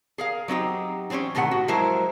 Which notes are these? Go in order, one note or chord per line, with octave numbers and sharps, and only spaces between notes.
G#4 A#4 F5
F#3 C4 D#4 G4
E3 C4 C#4 G4 C#5
A2 C3 D#3 F4 F#5
F#4
F3 F#3 G#3 E4 A#4 C5